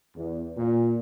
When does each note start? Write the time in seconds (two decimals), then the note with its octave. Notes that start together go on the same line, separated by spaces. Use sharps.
0.15 E2
0.56 A#2